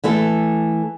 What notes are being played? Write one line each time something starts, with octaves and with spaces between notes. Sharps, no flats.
E3 A3 A4